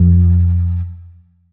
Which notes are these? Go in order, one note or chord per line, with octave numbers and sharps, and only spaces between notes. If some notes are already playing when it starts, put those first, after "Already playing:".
Already playing: F2